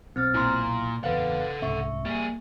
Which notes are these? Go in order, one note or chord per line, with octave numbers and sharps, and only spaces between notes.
B1 C4 F6 A6
A#2 E4 A#5 C6
F#1 E2 A2 A4 B4 F5 F#5
C2 G#2 C#4 E5 C#6
G3 A#3 G#4